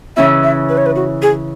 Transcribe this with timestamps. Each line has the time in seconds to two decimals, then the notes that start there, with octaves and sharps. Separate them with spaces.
0.17 C#3 E3 C#4 E4 E5
0.43 E5
0.69 B4
0.78 C#5
0.86 B4
0.96 F#4
1.22 G#4